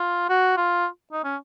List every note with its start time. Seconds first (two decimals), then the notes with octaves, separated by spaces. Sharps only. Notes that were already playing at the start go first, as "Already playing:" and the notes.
Already playing: F4
0.29 F#4
0.57 F4
1.13 D#4
1.24 C#4